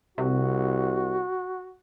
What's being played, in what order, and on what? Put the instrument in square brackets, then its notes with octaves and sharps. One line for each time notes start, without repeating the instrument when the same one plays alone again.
[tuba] C2 [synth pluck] C3 [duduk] F#4